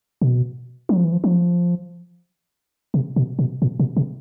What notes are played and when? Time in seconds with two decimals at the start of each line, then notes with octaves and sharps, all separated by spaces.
0.22 B2
0.89 F#3
0.97 F3
1.04 E3
1.12 F3
1.24 F3
2.94 C3
3.16 B2
3.39 B2
3.62 A#2
3.80 B2
3.97 C3